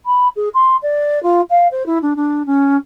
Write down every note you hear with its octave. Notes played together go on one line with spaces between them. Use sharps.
B5
G#4
C6
D5
F4
F5
C5
E4
D4
D4
C#4